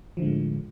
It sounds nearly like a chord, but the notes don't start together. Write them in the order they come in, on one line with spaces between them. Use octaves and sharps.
F3 D3 G#3 A2